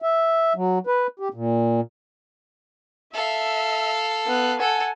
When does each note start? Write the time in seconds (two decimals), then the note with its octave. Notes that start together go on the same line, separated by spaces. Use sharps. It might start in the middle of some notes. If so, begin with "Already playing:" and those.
0.02 E5
0.56 F#3
0.87 B4
1.20 G4
1.34 A#2
3.14 A4 E5 F5
4.27 B3 F#6
4.60 A4 F#5 G#5